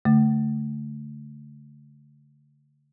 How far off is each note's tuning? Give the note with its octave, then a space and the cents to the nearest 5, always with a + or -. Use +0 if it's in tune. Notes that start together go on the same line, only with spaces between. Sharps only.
D3 -40 A3 +0